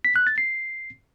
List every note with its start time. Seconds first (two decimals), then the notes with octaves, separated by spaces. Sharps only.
0.05 B6
0.16 F#6
0.27 A6
0.38 C7